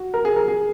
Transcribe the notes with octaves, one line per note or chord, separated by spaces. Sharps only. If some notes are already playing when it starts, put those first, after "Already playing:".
Already playing: F#4
A#4
G#4
A#4
G#4